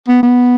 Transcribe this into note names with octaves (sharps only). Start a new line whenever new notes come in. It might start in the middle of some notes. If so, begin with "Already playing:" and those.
B3
B3